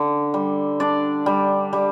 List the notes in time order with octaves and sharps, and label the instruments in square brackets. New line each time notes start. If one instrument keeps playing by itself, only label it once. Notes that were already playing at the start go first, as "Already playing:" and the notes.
Already playing: [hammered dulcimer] D3
G3
D4 D5
G3
G3